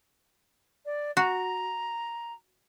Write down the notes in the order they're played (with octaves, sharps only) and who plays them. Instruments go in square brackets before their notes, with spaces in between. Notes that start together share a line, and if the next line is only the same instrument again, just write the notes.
[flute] D5
[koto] F#4 [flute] A#5